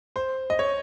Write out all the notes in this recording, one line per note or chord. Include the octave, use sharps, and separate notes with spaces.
C5
D#5
C#5